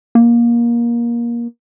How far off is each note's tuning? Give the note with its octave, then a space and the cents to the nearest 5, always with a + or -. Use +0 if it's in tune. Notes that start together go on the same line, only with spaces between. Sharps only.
A#3 +20